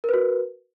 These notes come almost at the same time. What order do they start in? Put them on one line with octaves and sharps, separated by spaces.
A#4 B4 F#4